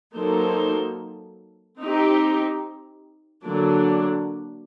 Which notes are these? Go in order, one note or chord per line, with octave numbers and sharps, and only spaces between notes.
F#3 A#3 D#4 A4 C5
C4 D#4 G4
D3 F#3 A#3 D4